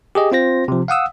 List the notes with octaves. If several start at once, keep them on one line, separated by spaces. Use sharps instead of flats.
G4 G#4 D#5
C4 F4 C5 A#6
C3 F3
F5 F#5 D#6 E6